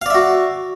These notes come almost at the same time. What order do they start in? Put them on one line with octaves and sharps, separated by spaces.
F5 D5 E5 F#4